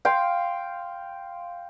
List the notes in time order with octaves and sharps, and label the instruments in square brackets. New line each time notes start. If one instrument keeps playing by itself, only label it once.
[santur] F5 G5 C6